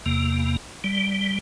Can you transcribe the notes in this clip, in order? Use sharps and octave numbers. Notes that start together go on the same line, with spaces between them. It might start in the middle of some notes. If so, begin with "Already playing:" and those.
E2 C3 A#3
G3